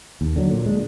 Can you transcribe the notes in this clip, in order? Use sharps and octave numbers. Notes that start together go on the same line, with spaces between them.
D#2
D3 F#3
A#2
G#3 D4